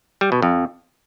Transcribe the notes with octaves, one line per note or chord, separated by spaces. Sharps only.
G3
B2
F2